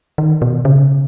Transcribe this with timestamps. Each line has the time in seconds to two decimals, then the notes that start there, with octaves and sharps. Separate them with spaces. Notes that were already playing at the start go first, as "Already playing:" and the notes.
0.18 D#3
0.42 B2
0.65 C#3